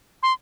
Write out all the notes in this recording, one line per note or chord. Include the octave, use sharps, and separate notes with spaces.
C6